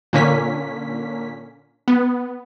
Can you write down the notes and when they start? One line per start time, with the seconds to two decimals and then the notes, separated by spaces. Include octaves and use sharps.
0.13 A#2 D3 A#3 C#4 B6
1.88 B3